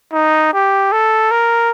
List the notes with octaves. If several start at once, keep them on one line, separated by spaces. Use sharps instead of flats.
D#4
G4
A4
A#4